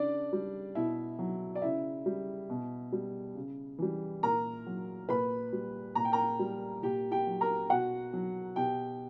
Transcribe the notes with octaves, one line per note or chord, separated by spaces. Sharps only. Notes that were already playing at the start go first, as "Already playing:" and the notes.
Already playing: C#3 D4 D5
G3
B2 E4 E5
F#3
D5
C#3 E4 E5
G3
B2
G3
C#3
E3 G3
A#2 A#4 A#5
F#3
A#2 B4 B5
G3
A#2 A#5
G5
A#4 A#5
G3
A#2 G4 G5
G4 G5
F#3
A#4 A#5
B2 F#4 F#5
F#3
B2 G4 G5